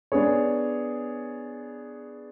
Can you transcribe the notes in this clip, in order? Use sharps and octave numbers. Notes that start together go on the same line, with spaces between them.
B3 D4 G#4 C#5